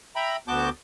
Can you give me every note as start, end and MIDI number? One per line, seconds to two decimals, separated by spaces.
0.16 0.36 76
0.16 0.36 79
0.16 0.36 82
0.16 0.36 83
0.48 0.69 38
0.48 0.69 59
0.48 0.69 66
0.48 0.69 81
0.48 0.69 86
0.48 0.69 91